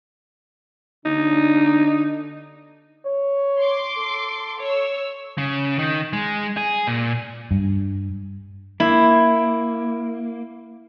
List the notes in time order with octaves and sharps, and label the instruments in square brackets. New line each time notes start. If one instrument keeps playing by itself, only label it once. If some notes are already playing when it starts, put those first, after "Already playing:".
[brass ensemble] D3 D4 [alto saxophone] D#4
[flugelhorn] C#5
[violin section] C6 D6
[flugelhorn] A4
[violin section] C#5 E6
[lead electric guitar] C#3
D#3
G#3
G#4
A#2
[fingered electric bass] G2
[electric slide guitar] A#3 [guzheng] E4